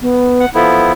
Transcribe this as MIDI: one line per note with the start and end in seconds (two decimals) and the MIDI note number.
0.01 0.45 59
0.40 0.49 78
0.54 0.92 53
0.54 0.92 59
0.54 0.92 64
0.54 0.91 69